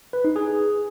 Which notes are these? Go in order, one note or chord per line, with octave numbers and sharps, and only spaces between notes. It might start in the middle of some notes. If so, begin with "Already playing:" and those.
B4
D#4
G#4